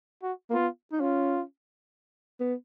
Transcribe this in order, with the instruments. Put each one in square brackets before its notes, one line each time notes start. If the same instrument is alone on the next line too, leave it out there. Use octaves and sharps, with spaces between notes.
[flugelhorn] F#4
[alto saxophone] A#3
[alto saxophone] B3 [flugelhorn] F4
[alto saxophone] D#4
[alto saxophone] C#4 [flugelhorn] F4
[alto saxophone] B3